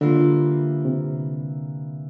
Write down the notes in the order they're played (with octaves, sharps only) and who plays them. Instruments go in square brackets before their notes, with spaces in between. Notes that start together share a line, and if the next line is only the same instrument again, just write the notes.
[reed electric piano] D3 [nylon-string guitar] E3 G3 A#3 F4
[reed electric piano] C3